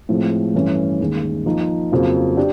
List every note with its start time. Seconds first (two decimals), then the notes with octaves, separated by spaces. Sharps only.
0.09 A2 F3 G#3 C4
0.54 G2 E3 A3 C#4
1.00 D#2 D#3 G#3
1.46 F3 A#3 D#4
1.92 F2 C#3 F#3 A#3
2.37 D4 G4